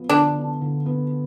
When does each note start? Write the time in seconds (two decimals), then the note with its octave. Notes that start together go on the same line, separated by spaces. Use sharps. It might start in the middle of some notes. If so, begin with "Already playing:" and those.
Already playing: F3 B3
0.09 D3 D4
0.36 B3
0.61 D3
0.86 B3